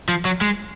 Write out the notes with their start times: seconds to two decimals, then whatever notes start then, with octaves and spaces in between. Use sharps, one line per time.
0.08 F3
0.25 F#3
0.41 G#3